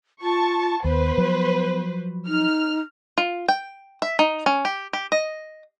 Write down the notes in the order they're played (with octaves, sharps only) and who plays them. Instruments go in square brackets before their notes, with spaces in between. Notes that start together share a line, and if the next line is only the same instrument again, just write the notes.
[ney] F4 [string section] A5 C#6
[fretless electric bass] D#2 [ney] B3 [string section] B4 C5
[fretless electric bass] F3 F#3
[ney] D#4 [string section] F6
[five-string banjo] F4
G5
E5
D#4
C#4
G4
G4
D#5